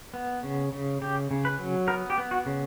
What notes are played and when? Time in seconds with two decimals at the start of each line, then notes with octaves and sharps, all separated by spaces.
0.14 B3
0.43 C#3
0.73 C#3
1.01 C#3 G4
1.31 C#3
1.45 B4
1.59 F#3
1.88 B3 A#4
2.10 G4
2.18 B3
2.31 F#4
2.46 C#3